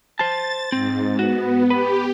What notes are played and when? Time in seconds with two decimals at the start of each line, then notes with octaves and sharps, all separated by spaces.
0.19 C5 A5 A6
0.72 G#2 C4
1.19 B3 F#4
1.70 G4 B4